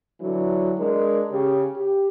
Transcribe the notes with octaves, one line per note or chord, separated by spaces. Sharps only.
D3 E3 F#3
G#3 D4 A#4
C#3 G4
G4